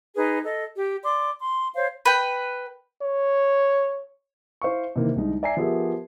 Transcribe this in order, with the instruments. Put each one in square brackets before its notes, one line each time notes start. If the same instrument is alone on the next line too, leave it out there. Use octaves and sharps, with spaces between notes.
[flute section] D#4 G#4 B4
A4 D#5
G4
D5 C6 D6
C6
C5 C#5 F5
[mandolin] B4 G5
[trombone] C#5
[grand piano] E4 C5 F5 C#6
C3 D#3 E3 A#3
C2 D3 G#3 D#4
D5 E5 G#5 A#5 C7
F3 B3 G4 G#4 A#4 E5